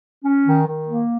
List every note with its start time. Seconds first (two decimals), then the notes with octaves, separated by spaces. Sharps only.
0.24 C#4
0.46 D#3
0.67 D#3
0.88 A#3